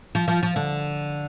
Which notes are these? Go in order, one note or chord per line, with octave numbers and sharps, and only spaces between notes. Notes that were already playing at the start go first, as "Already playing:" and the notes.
F3
F3
F3
D3